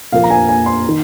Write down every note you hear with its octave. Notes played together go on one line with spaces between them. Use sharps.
A#2 F3 A#3 F5
A#5
G#5
G#5
C6
D#3